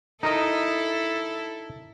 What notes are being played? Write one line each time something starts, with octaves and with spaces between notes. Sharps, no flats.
D#4 E4 A4 A#4 D#5